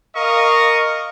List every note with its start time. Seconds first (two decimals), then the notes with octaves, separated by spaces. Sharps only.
0.15 A#4 D#5 F5 C#6